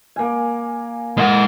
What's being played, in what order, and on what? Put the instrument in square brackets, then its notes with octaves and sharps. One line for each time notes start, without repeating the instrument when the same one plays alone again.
[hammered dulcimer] A#3 G#5
[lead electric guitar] G#3 F#5 [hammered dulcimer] A#4